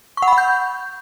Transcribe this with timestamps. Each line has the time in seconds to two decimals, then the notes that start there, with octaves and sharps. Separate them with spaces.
0.17 C#6
0.22 F#5
0.28 B5
0.33 F#5
0.38 G6